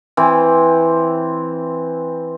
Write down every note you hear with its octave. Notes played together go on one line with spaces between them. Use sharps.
E3 C4